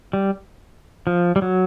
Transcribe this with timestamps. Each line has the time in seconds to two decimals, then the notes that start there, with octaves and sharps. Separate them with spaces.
0.13 G3
1.07 F3
1.36 G3
1.42 F#3